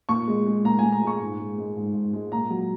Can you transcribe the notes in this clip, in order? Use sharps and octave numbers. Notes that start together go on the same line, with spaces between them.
A#2 C#6
G#3
G#3
A#2 A#5
A#2 G#5
A#5
G#3
C#6
G#2
G#3
G#3
G#2
G#2
G#3
A#2 A#5
F#3